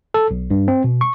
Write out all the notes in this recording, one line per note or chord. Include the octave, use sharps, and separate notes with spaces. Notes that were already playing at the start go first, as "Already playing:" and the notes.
A4
B1
G2
C4
B2
C#6